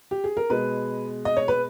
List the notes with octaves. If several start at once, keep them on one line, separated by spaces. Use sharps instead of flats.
G4
G#4
A#4
B2 G#3 B4
D#5
C#5
B4